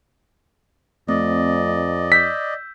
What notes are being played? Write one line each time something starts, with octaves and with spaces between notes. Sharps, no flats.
F2 A3 C4 D5 D#5
E6 G6 B6